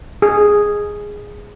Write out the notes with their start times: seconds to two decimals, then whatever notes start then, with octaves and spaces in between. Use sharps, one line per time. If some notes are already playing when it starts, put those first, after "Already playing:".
0.22 G#4